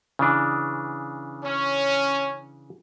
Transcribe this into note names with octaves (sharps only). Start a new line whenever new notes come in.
C#3 E3 D4
C#4